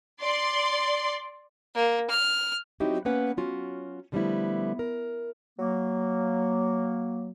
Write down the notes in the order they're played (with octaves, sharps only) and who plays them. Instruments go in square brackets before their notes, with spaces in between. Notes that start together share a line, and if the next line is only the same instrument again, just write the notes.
[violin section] D5 C6
[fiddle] A#3
F6
[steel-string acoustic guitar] F#3 C4 D#4 E4 F#4 G4
A#3 B3 C#4 B4 F#5
F#3 C#4 F4 F#4
D3 F3 G3 A3 B3 E4
A#4
[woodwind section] F#3 A#3